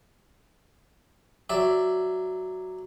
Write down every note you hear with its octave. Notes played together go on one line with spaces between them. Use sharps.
F#3 D5 E5